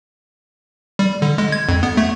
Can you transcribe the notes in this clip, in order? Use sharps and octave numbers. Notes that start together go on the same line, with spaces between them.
G3
D3
G#3
G#6
F2
B3
A3